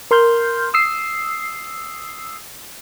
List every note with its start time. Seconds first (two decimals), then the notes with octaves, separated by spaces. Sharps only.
0.11 A#4 C6 F6 G6
0.74 D#6 E6 C7